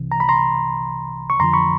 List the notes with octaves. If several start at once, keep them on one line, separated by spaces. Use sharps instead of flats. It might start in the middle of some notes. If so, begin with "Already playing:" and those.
Already playing: C2 C3 E3
A#5
B5
A#5 C6
C#6
F2 D3 F3 A#5 C6
B5 C#6